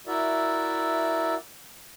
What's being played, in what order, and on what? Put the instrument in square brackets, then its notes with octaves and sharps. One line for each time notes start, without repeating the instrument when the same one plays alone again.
[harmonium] E4 F#4 A#4 D5 E5